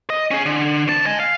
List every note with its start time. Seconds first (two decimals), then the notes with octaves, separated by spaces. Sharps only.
0.10 D#5
0.31 C#4 G#4
0.46 D3
0.88 C2 A5
1.06 D#5 G#5
1.20 F5